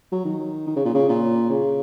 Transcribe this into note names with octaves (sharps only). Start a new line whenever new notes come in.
F#3
D#3
D#3
C#3
A#2
C#3
A#2
C#3